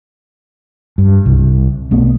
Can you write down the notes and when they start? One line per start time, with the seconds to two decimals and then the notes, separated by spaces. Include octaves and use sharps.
0.98 G2
1.26 C2
1.91 B1 A3 B3